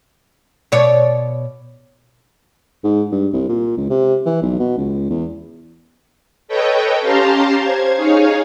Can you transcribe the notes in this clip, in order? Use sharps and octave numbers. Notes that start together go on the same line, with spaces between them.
B2 C#5 D5
G#2
G2
C2
A#2
C#2
C3
E3
B1
B2
C#2
E2
A4 B4 C#5 D#5 G5
C#4 G4 F5 A5 A#5 C6
C5 G#6
D#4 G#4 C#5 F5